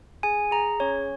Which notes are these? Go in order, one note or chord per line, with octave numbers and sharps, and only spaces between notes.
G#4 G#5
G#4 A#5
C#4 C#5